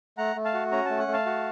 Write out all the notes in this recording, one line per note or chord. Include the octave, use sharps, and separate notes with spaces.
A3 F#5 A#5
A3
F5 A5
F#4
C#4 A#5
A3 A5
F#5
A3
F5 A5
F#4